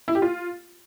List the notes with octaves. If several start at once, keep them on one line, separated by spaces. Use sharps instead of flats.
E4
G4
F4